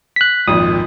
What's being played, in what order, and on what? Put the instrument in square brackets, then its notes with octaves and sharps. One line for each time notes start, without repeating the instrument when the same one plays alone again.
[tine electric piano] F#6 B6
[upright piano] G#1 F2 A#2 [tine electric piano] D#6